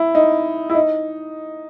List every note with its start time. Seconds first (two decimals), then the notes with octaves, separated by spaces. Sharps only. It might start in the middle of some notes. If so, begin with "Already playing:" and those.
Already playing: E4
0.15 D#4
0.70 E4
0.75 D#4